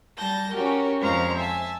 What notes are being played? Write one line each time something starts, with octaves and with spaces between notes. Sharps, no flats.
G3 A5 G6 A#6
C#4 F#4 G4 A#4
F2 G#3 C5 F5 A#5 C#6
E5 G#5 A5